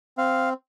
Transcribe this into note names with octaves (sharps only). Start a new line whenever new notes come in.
C4 F5